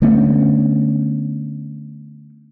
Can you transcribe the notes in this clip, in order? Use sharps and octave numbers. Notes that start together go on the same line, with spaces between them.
D3 A3 B3 C#4